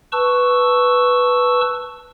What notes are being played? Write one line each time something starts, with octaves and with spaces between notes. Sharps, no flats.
B4 A5 C#6 E6